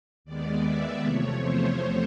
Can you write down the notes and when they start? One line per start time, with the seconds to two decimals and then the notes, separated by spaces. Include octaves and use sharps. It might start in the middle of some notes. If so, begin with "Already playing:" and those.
0.25 D#2 D#3 G#3 B3 D5
0.63 E5
1.02 E2 C3 F3 A3 C#5
1.40 C5